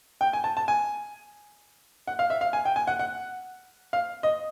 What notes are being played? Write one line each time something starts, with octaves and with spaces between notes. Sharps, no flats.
G5
G#5
A5
A5
G#5
F#5
F5
E5
F5
G#5
G5
G#5
F#5
F#5
F5
D#5